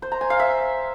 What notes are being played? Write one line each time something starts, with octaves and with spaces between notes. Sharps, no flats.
C5
A#5
G#5
F5
E5